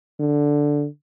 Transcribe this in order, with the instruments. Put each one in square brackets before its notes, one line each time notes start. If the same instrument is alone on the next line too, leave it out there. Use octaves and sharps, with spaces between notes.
[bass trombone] D3